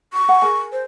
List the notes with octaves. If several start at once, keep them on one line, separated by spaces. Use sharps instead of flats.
C#6
F#5 G#5
G#4 A#4 G#5
C5